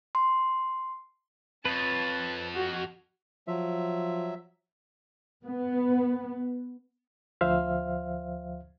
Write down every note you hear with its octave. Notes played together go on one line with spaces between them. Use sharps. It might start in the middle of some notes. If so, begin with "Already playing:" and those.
C6
F2 B4 C#5 A5
F#4
F3 F#3 E5
B3
D2 F3 C5 E5 F5 F6